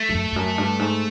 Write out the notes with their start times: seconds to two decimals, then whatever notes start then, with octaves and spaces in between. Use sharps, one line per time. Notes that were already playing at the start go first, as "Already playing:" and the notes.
Already playing: A3
0.09 G2
0.14 F#2
0.32 F2
0.36 F#2
0.58 G2
0.79 G#2